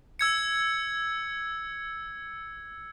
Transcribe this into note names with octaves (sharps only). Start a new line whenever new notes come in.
E6 G#6 C#7